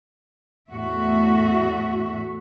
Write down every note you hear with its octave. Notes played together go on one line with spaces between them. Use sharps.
E2 A2 A3 F#4 E5